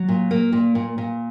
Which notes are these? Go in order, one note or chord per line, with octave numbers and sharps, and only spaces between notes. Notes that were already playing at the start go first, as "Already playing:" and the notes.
Already playing: F#3
A#2
A#3
A#2
A#2
A#2